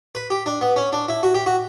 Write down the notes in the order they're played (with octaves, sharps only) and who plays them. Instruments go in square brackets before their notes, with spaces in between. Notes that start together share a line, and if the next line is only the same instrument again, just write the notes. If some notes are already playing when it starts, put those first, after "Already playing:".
[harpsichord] B4
G4
D4
B3
C#4
D4
E4
F#4
G4
F#4